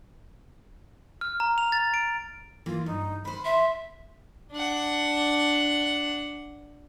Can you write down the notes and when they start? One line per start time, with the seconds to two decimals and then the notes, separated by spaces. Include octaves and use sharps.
1.21 F6
1.40 A#5
1.58 F7
1.72 A6
1.94 D7
2.66 E3 A#3 F4
2.86 G2 D#4
3.25 D#3 C5 B5
3.45 E5 C6
4.52 D4 F#5